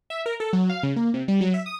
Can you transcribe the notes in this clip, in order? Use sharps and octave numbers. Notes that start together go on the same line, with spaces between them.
E5
A#4
A4
F#3
F5
C#3
A#3
C3
G3
F#3
E5
D#6